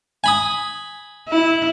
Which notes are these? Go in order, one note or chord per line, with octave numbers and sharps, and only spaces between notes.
G#5 B5 D#6
E4